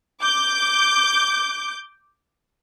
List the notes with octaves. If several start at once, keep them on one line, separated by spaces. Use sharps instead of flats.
D6 G6